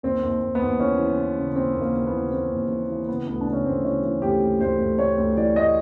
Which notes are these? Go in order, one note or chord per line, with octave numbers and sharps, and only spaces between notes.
D#2 C4
D#2
D#2
B3
D#2
E3 C#4
E3
E3
C#3
D#2 C4
D#2
A#3
D#2
B3
E3
E3 C4
D#2
E3
E3
C#3 B3
D2 B3
D4
C#3
C#4
D2 C4
E3 C#4
E3
D2 G4
D2
D2 C5
D2
D2 C#5
D2
E3 D5
D2 D#5